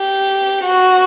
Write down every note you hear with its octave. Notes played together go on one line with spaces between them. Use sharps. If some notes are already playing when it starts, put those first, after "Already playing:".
Already playing: G4
F#4